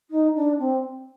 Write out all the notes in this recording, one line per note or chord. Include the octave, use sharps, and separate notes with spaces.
D#4
D4
C4